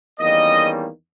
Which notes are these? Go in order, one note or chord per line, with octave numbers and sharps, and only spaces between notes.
E2 D#3 G3 A#3 C#4 D#5